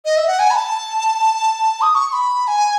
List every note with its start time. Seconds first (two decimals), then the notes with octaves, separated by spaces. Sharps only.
0.05 D#5
0.17 E5
0.27 F#5
0.39 G#5
0.51 B5
0.55 A5
1.82 D#6
1.95 C#6
2.08 C#6
2.13 B5
2.48 G#5